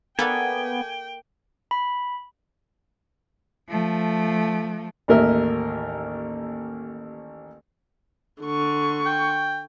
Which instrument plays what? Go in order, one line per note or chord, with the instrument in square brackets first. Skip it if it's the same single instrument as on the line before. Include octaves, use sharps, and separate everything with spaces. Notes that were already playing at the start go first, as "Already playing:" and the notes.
[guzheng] A#3 A4 D5 [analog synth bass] B3 [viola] G5 [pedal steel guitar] G#5
[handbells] B5
[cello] F3 A3
[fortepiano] A1 D#2 A#3 A#4 D#5 E5
[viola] D3 C#6
[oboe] G5